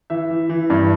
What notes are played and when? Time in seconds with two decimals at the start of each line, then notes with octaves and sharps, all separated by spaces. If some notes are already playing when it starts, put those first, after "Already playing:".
0.10 E3 E5
0.30 E3
0.49 E3
0.70 G2